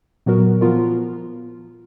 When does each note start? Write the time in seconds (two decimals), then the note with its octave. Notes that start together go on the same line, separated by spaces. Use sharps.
0.26 A#2 F#3 B3 F#4 A#4
0.61 F3 B3 F4 A#4